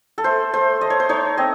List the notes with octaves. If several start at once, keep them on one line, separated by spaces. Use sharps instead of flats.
A4
A3 C5
A3 C5
A3 D#5
C#5
C5
D#4 C#5
C4 D#5